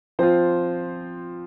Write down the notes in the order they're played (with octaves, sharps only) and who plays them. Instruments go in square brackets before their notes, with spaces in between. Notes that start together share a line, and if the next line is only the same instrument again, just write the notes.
[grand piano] F3 C4 F4 C5